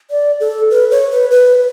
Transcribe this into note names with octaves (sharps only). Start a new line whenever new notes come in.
D5
A4
B4
C#5
B4
B4